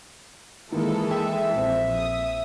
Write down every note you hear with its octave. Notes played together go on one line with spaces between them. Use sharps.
D#3 E3 G#3 A#3 E4 A4
E5 G5
A#1 C4
D#6